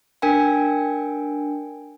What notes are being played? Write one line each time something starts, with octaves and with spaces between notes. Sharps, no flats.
D4 A#4 G5 G#5